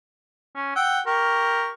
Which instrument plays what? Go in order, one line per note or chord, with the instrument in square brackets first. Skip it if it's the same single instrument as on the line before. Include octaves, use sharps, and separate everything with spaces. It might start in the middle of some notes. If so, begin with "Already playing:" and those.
[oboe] C#4
[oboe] F#5 [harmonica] G5 E6
[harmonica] G4 C#6 [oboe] A#4